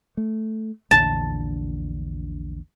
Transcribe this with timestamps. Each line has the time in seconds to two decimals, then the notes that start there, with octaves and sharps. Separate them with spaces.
0.17 A3
0.91 A#1 E2 D3 A5